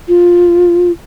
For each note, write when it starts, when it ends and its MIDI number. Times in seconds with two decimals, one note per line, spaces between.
0.08 0.92 65